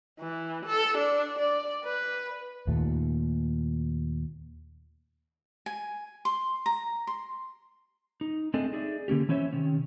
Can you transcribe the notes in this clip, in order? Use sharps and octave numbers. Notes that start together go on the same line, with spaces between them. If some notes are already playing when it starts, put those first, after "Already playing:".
E3
A4
D4
D5
B4
D#2 A#2 A3
G#5
C6
A#5
C6
D#4
A3 C4 D4 G#4 A4 D#5
D#4 G#4 D5 E5
D3 A#3 C#4 G4
E3 C#4 C5 C#5 E5
C3 D#3 C#4